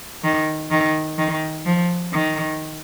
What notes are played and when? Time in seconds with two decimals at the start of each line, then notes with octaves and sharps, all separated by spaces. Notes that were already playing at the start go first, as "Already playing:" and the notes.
0.24 D#3
0.71 D#3
1.18 D#3
1.66 F3
2.13 D#3